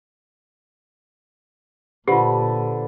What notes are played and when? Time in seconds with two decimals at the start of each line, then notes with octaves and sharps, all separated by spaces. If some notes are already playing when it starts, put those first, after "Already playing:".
2.08 A#2 D3 F4 G4 B4 C5 B5